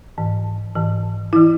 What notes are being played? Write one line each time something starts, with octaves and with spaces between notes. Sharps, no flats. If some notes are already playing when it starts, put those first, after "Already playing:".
G#2 E3
G#2 E3
E3 E4